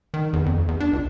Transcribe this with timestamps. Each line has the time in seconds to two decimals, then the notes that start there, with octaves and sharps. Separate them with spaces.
0.14 D#3
0.33 E2
0.46 F2
0.68 E2
0.80 D4
0.93 C#2